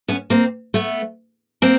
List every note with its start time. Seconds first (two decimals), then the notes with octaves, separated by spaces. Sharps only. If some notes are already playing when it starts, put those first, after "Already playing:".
0.08 B3 C#4
0.30 A#3 C4
0.74 A3 B3
1.62 A#3 C4